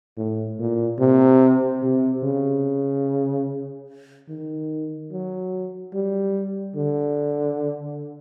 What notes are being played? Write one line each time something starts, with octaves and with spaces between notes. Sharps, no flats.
A2
A#2
C3
C3
C#3
D#3
F#3
G3
D3